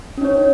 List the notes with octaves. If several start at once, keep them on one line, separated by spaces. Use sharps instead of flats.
C#4 D#4 C#5